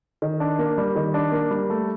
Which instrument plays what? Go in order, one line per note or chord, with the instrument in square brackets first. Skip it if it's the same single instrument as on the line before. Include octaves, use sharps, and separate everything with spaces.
[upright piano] D#3
D4
A#3
G3
D#3
D4
A#3
G3
A3